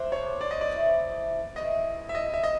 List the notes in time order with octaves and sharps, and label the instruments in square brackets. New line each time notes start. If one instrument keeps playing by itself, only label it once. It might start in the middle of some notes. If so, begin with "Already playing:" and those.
Already playing: [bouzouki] F#3 A3 D4 G4 [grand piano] C5
[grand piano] C#5
D5
D#5
D5
[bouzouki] E3 A3 C4 E4
[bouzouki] E3 A3 C4 E4 [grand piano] D#5
[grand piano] E5
D#5
E5
[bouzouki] F#3 B3 [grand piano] D#5